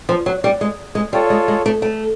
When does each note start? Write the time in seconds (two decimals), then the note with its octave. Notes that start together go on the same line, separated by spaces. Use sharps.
0.09 F3
0.26 F#3
0.44 G3
0.61 G#3
0.95 G#3
1.13 G3 F4 A4 C#5
1.30 G#3
1.48 G#3
1.66 A3
1.82 A3